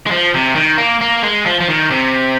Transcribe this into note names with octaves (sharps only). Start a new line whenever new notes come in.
G#3
F3
C3
D#3
A#3
A#3
G#3
F3
F3
D#3
C3